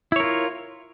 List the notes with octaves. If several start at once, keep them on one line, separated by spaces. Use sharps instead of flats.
E4 F4 A#4 C#5